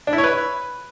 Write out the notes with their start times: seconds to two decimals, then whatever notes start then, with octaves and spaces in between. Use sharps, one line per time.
0.07 D4
0.13 E4
0.18 C#5
0.24 B4